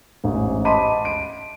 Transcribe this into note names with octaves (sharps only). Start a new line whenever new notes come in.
A1 G#2
D#5 A5 B5 C6 D6 D#7
D7